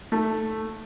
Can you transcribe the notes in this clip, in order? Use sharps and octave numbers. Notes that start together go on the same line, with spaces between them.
A3